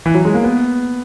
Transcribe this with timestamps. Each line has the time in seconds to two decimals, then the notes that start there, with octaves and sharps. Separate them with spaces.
0.06 E3
0.14 F#3
0.25 G#3
0.34 A#3
0.44 B3